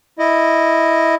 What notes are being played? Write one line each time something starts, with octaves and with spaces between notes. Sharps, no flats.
E4 D#5